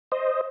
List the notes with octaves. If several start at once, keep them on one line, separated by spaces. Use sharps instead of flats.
C5 D#5